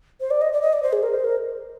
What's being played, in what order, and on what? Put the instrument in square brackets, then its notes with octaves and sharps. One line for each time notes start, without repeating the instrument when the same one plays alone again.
[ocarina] C5
D5
D#5
D5
D#5
D5
C5
G#4
A#4
C5
A#4